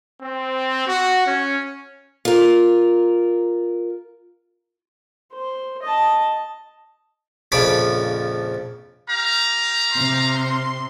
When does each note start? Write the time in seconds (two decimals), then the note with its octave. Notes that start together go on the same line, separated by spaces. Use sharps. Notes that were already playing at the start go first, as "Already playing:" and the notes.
0.21 C4
0.87 F#4
1.25 C#4
2.25 F4 A#4
5.33 C5
5.82 D#5 A5
7.52 A#1 F2 C#3 F3 B5 D6
9.10 G4 F5 A#5
9.92 C3 C6